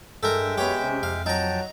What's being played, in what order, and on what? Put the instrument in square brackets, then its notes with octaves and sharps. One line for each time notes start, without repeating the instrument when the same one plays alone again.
[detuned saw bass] G2 [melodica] G#3 E5 G5 [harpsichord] A4 A#4
[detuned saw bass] F#2 [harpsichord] B3 G4 [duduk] C#5
[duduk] C3 [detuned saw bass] C#4
[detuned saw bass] F2 [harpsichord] F5
[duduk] F#3 [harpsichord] D#4 A#5 [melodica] G5 A5